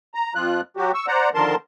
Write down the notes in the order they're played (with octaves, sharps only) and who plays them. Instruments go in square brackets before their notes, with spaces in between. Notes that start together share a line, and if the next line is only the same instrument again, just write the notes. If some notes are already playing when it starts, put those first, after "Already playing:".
[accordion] A#5
F2 F3 F4 F#6
F#3 F#4 G4
C#6 E6
C5 D5 F#5 A#5
D3 D#3 F3 A#4 A5 C6